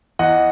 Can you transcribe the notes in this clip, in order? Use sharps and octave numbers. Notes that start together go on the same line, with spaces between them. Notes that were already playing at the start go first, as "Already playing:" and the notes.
E2 D#5 F#5